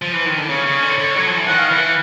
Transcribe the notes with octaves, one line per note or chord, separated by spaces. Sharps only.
F3
E3
D#3
D3
C#3 C#5
C#3
D3
D3
F#3
F3
E3
D#3 F#5
F5
E3 F#5